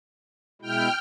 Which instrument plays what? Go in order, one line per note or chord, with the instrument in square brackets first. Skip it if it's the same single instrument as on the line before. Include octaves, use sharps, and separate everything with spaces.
[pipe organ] B2 G#3 E4 [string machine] G5 F6